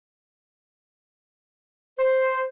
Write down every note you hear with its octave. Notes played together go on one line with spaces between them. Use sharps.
C5